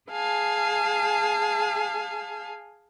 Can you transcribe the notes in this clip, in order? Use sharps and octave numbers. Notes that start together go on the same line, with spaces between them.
G#4 F5 G#5 A5